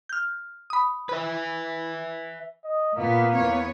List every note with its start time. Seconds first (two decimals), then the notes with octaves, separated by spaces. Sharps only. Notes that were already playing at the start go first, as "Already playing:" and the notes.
0.09 F6 G6
0.70 B5 D#6
1.09 B4 E5 B5
2.64 D#5
2.96 A#2 A#3 B3
3.34 E2 B3 C#5